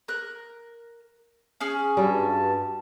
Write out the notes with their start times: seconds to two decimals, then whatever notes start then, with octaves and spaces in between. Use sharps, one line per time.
0.08 A#4 F#6
1.61 C#4 G#4 F6
1.97 G2 G3 F#4 A5